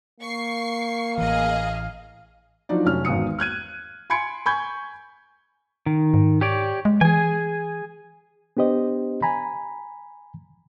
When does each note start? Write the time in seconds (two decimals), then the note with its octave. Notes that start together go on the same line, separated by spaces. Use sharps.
0.20 A#3 C#6 C7
1.18 A1 E3 G#4 D#5 F5
2.69 F3 F#3 D4 D#4 D5
2.85 F1 F#3 C#4 F6
3.05 G#1 E2 F#4 D#6 C#7
3.39 F6 F#6 G#6 D#7
4.10 G#5 B5 C6 G#6 C#7 D7
4.46 G#5 B5 C#6 G6 G#6
5.86 D#3
6.14 G#2
6.41 G4 C#5 D5
6.85 G#3
7.01 E3 G#4 G#5
8.57 B3 D4 G4 C5 D#5
9.22 G#5 A#5 B5